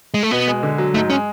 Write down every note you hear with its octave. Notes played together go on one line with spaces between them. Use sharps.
G#3
A3
B2 B3
G#3
D3
F#3
G#2 A3
G#3 C#4